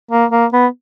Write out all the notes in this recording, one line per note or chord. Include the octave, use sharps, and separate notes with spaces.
A#3
A#3
B3